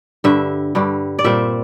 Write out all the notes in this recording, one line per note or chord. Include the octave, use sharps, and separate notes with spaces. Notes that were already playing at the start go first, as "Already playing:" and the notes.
G2 D3 G3 E5
G2 D3 G3
D5
A#2 G3 C4 E5